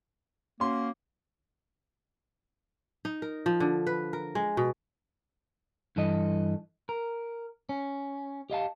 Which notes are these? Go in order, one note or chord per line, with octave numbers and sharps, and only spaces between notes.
A#3 C#4 F#4 C6
D#4
A#4
F3
D3
B4
A#4
G#3
B2
G2 E3 A4 D#5
A#4
C#4
G4 D#5 F5 A5